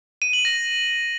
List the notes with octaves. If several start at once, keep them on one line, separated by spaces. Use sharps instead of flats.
D#7
F#7
A#6